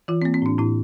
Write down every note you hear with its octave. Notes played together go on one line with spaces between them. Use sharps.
E3 F4
C4
A#3
C4
A2 D4
A2 E4